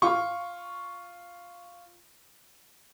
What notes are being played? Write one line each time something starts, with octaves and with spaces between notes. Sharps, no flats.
F4 C#6